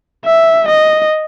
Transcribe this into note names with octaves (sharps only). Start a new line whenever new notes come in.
E5
D#5